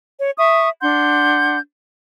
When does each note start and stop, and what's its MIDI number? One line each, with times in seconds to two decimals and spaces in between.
0.18 0.31 73
0.38 0.68 76
0.38 0.68 85
0.38 0.68 87
0.82 1.58 62
0.82 1.58 78
0.82 1.58 84
0.82 1.58 91